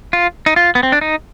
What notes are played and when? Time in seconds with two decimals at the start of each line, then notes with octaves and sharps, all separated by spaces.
0.13 F4
0.46 D#4
0.56 F4
0.75 B3
0.83 C4
0.92 D4
1.01 D#4